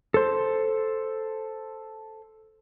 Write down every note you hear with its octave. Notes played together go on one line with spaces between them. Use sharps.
A4 C5